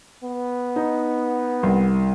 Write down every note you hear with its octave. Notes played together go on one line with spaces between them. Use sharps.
B3
D#4
C2